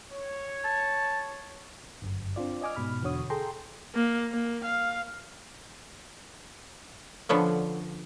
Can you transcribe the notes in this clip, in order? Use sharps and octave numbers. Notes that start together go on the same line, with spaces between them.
C#5
A5
G1 F#2
C4 D4 F4 D5
D5 D#5 G#5 D6 F6
G#2 B2 B5 F6
E2 B2 D3 F#4 C#5 D#6
G#4 A4 G5 A#5 C6
A#3
A#3
F5
D3 F3 B3 C#4